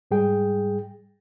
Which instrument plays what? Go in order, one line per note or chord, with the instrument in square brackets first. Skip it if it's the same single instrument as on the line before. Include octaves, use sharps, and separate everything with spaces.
[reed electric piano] G#2 G3 G#4 G5